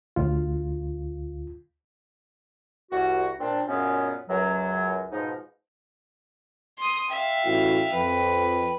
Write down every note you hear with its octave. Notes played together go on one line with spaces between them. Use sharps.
D2 F4
C2 F#4
A#2 C4 D4
F#2 A#2 C#3 G#3 B3 C#4
C#2 F#2 F#3
G#2 B2 F3 D#4
C6 D#6
E5 F5 G5
A1 E4 F#4 G5
F2 B4